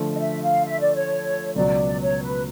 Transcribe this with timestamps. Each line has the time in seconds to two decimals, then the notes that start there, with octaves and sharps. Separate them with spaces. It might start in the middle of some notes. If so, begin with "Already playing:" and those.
Already playing: D3 F3 A3
0.13 D#5
0.20 E5
0.43 F5
0.66 E5
0.80 D5
0.95 C#5
1.56 C#2 B2 F#3 D5
2.00 C#5
2.22 B4